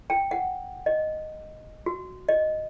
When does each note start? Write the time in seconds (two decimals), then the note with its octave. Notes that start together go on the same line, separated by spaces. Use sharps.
0.10 G5
0.31 F#5
0.86 D#5
1.86 F#4
2.29 D#5